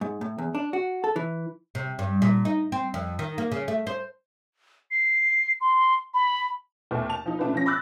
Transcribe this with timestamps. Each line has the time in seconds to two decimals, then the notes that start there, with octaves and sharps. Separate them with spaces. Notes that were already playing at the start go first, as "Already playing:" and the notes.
0.01 G#2
0.21 A2
0.38 E2
0.55 D4
0.73 F#4
1.04 A4
1.16 E3
1.75 C3
1.99 G2
2.22 A#2
2.45 D#4
2.72 C4
2.94 F2
3.19 D#3
3.38 A#3
3.52 C#3
3.68 A3
3.87 C5
4.91 C7
5.61 C6
6.14 B5
6.91 D#2 A#2 A3 B3
7.09 A5 F7
7.26 F3 D#4
7.39 C#3 A3 D4 F4 B4
7.53 C#3 F3 C#4 A#6
7.66 B5 D6 E6 F#6 A6